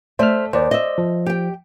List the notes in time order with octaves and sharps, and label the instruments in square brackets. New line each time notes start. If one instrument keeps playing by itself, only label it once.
[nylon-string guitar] A3 D5 E5 [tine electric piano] C5 F6
[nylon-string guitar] D#2 [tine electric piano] C5 D5
[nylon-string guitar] D#5 E5
[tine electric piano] F3
[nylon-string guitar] G4 G5